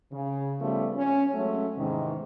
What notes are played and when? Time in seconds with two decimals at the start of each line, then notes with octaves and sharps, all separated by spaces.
0.12 C#3
0.60 F3 G3 A3 B3 C#4
0.95 C#4
1.34 F#3 G#3 A3 C#4
1.76 E2 G#2 C3 D#3